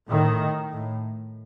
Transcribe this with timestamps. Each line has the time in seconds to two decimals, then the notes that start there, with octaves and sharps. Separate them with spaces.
0.10 A2 D#3
0.72 A2